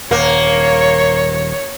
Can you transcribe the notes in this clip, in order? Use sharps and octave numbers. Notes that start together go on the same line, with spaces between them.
D#1 A#3 C#5